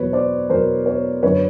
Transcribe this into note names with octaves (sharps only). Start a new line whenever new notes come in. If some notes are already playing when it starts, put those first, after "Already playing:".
Already playing: E2 B2 F#3 B4 C#5
C5 D5
E2 B2 F#3 A#4 C5
B4 C#5
F#2 D3 F#3 B4 C#5